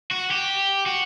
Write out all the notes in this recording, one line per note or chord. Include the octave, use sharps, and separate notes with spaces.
F#4
G4
F#4